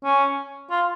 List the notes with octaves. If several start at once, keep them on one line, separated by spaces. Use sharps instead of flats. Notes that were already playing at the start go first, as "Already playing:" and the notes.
C#4
F4